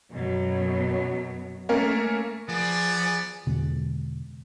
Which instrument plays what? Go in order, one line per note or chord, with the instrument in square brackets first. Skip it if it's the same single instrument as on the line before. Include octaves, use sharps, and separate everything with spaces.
[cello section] F#2 B2 F#3
[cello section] A3 [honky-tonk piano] A#3 C#4 A#4
[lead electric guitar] F3 [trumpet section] B3 D5 [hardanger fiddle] G#4
[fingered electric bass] E2 B2 D3 G#3